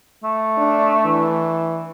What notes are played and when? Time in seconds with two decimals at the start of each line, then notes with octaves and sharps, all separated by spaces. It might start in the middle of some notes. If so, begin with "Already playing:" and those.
0.24 A3
0.58 D4
1.06 E3